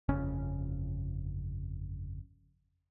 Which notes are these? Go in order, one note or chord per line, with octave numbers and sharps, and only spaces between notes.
G1 F2 C#3 C#4